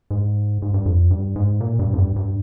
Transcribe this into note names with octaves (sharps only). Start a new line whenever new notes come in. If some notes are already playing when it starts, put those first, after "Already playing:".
G#2
G#2
G2
F2
G2
G#2
A#2
G2
F2
G2
G2